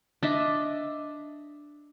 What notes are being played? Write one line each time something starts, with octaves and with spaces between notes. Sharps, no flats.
D4 D#5 E5